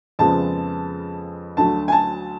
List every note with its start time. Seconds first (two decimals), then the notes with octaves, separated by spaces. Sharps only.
0.19 F2 C#3 F3 G#3 B3 A5
1.57 D2 D3 F#3 A3 A5
1.88 G#5
1.92 A5